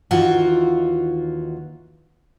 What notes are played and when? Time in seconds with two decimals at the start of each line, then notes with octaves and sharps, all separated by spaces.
0.11 D#2 D#3 E3 F4 F#4 F#5